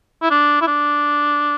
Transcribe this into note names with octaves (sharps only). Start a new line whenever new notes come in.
E4
D4
E4
D4